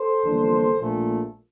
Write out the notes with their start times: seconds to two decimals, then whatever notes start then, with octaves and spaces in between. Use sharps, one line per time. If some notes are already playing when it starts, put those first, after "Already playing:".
Already playing: A4 C5
0.25 G1 F2 E3 A#3 D4
0.80 A#1 A#2 A3